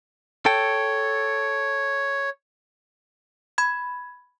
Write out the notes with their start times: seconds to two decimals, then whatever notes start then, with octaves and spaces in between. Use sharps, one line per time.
0.46 A4 C#5 G5
3.58 B5 G#6